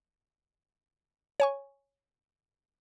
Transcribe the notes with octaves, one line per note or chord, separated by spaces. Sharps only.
C#5 G#5 C#6